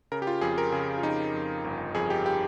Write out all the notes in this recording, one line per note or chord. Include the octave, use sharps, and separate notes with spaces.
C#3 A#4
G4
F4
F2 G#4
A#4
C#3 G#4
F4
F2 D#4
F2
G1
F2 G#4
G4
G4